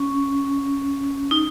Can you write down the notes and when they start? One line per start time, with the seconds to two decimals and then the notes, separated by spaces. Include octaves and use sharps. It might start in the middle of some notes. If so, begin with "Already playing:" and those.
Already playing: C#4
1.31 D#4